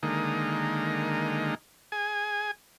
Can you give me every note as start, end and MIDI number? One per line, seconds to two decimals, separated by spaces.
0.03 1.55 50
0.03 1.55 51
0.03 1.55 56
0.03 1.55 58
0.03 1.55 63
1.92 2.51 68
1.92 2.51 80